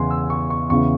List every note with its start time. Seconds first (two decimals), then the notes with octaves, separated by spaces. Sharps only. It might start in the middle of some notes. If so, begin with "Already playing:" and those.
Already playing: E2 C#3 E3 G#5 C6
0.11 E6
0.30 C#6
0.50 C#6
0.69 E2 C#3 E3 C#6